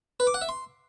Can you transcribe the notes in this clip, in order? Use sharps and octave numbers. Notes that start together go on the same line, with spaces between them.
B4
D6
F#5
E5
C6